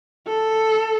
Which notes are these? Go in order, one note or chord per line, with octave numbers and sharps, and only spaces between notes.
A4